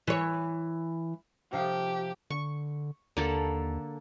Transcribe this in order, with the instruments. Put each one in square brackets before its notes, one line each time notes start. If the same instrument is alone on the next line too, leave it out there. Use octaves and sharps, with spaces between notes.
[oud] E3 C#5
[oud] C3 F3 F5 [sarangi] G4
[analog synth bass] D3 [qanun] C#6
[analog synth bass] D#2 [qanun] D3 A#3 A4